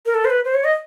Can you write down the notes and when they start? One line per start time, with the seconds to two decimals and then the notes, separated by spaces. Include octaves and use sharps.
0.06 A#4
0.14 A4
0.25 C5
0.30 B4
0.45 C5
0.54 C#5
0.64 D#5